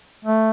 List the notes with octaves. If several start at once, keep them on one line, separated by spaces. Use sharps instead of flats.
A3